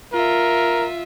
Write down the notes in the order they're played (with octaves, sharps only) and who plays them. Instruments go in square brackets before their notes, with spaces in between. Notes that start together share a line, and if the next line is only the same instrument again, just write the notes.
[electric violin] F4 E5 [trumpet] A#4